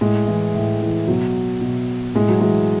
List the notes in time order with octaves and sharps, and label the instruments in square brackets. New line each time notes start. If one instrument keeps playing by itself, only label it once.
[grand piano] A2 G#3
E3
A2
E3
B2 F#3
B2
A2 G#3
F#3
E3 G#3